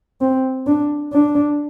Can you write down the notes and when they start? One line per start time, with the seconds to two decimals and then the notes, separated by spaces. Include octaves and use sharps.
0.21 C4
0.67 D4
1.13 D4